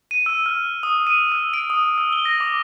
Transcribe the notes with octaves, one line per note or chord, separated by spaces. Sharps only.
D#7
E6
F6
D#6
D#7
E6
D7
D#6
E6
G7
A#6
D6